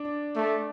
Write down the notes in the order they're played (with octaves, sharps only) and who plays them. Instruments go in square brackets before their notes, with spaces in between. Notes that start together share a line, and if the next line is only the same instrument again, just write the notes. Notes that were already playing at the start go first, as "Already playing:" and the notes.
Already playing: [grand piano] D4
[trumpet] A3